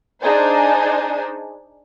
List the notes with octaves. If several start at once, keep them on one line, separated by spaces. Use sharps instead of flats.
D4 D#4 G#4 C5